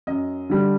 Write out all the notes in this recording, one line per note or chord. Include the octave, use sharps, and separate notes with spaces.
F#2 D#5
D3 G3